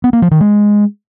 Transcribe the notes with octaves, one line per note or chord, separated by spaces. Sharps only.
B3
A#3
F3
D#3
G#3